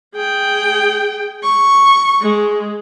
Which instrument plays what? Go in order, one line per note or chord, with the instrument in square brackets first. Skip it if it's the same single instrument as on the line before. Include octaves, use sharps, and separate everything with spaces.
[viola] G#4 G5
C#6
G#3